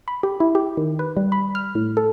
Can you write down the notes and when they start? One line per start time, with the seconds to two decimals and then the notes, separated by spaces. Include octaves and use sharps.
0.08 B5
0.23 G4
0.40 E4
0.55 G4
0.77 D#3
0.99 B4
1.17 G3
1.32 B5
1.55 F6
1.75 A2
1.97 A4